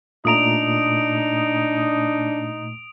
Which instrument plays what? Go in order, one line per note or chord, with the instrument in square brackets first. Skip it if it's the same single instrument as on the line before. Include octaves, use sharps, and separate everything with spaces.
[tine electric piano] A#2 A3 A#5 [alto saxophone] D4 [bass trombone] D#4 [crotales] D#6 D7 F7